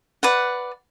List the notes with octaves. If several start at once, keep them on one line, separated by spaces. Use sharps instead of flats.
B4 D5 F#5